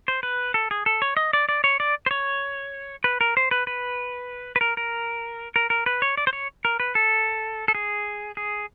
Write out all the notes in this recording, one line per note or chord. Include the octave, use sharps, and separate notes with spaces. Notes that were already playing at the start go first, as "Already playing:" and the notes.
C5
B4
A4
G#4
A4
C#5
D#5
D5
D5
C#5
D5
C5
C#5
B4
A#4
C5
B4
B4
B4
A#4
A#4
A#4
A#4
B4
C#5
D5
C5
C#5
A#4
B4
A4
A4
G#4
G#4